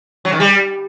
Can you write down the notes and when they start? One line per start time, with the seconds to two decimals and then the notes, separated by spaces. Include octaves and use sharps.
0.25 F#3
0.32 D#3
0.40 G3